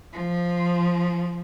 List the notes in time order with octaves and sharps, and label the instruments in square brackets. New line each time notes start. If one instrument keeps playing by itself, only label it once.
[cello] F3